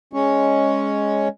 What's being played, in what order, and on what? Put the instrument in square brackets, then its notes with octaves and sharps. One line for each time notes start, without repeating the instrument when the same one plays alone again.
[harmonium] G#3 C#4 C#5